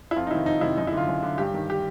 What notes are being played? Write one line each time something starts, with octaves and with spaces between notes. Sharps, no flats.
E4
F2 F4
D#4
C3 D#3 E4
F2 D#4
C3 D#3 E4
F#2 D#4
E4
D3
F4
F#2
D3
G2 G4
D#3
G4